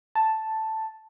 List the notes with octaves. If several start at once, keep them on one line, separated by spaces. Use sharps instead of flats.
A5